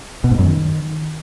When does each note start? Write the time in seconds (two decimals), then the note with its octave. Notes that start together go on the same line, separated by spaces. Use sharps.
0.24 B2
0.31 G#2
0.38 F#2
0.45 D#3